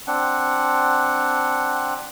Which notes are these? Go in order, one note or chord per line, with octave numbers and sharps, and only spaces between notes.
C4 D4 F#5